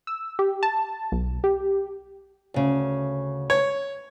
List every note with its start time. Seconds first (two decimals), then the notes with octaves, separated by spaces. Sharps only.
0.07 E6
0.39 G4
0.63 A5
1.12 B1
1.44 G4
2.54 D2 C#3
3.50 C#5